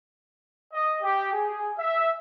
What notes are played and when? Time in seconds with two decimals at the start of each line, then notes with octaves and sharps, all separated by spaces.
0.72 D#5
1.01 G4
1.32 G#4
1.77 E5